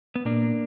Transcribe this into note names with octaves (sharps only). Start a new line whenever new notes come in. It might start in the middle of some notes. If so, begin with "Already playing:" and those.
B3
A#2 A#3 D4